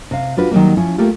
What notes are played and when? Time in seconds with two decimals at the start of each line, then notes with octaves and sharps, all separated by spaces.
0.11 C3 F5
0.37 D4 F4 F#4 B4
0.51 D#3 F#3 G3 A#3
0.77 F3 C#4 E4
0.98 A3 A#3 F4 G4